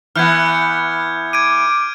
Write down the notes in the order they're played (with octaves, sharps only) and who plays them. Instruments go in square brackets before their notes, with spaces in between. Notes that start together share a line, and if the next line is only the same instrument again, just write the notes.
[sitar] E3 B3 [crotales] F6 G6 G#6
[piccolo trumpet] D6 [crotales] G#6 D7 D#7